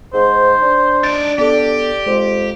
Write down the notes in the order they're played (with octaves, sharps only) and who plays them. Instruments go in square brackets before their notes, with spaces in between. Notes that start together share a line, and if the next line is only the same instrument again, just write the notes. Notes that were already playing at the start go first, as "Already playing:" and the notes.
[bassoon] G#2 [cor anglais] C5
[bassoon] D4
[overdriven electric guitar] D#4 D5 [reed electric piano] A6
[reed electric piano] B3 A4 [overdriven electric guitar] G4 [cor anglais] D5
[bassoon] F2 [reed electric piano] G#3 C5